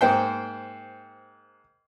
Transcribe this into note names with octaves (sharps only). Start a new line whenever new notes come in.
G#2 A#3 C5 G5